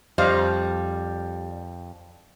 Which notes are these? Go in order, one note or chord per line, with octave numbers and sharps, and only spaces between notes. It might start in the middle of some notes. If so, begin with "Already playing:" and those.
F2 G3 C5 D#5 F5